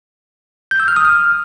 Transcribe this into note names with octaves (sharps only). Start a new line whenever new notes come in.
G6
E6
F6
D#6
F6